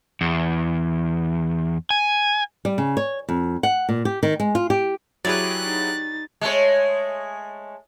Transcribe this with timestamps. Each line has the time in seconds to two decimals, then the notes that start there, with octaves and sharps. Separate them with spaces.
0.21 E2
1.90 G#5
2.65 G3
2.78 C#3
2.97 C#5
3.29 F2
3.63 F#5
3.89 A#2
4.05 G4
4.23 D#3
4.40 G#3
4.55 F4
4.70 G4
5.25 F#3 E4 G4 G#4 B4 C#5 D5 F#6
5.65 D#4 A6
6.41 G#3 A3 C#5